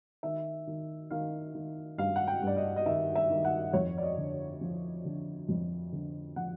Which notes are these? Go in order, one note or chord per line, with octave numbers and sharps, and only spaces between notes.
D#3 E5
D#3
D#3 F5
D#3
G2 F5
F#5
G5
G2 D5
D#5
D#5
D#3 E5
E5
D#3
F#5
F2 C#5
D5
D#5
D3
F3
D3
F2
D3
F3 F#5